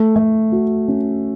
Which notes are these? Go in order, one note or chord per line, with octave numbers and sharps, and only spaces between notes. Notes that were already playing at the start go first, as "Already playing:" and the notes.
Already playing: A3
A3
F#4
C#4